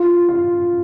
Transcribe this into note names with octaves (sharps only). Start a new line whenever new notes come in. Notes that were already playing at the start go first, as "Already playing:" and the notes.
Already playing: F4
F4